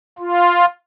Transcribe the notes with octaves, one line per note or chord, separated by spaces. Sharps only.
F4